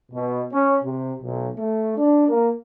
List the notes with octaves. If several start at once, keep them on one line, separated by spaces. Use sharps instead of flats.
B2
C#4
C3
B1
A3
D4
A#3